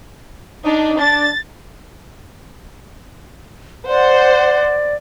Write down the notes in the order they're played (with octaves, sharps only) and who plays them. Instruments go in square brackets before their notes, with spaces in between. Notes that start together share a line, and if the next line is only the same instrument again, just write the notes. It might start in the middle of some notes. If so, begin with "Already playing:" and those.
[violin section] D4 [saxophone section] D#4
[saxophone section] D4 [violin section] A6
[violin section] C5 F#5 [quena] D5